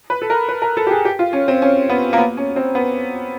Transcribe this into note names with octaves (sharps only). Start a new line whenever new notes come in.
B4
A4
A#4
B4
A#4
A4
G4
G#4
G4
F4
C#4
C4
C#4
B3
A#3
B3
C#4
C4
B3